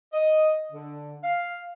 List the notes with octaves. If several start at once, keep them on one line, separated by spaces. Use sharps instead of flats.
D#5
D3
F5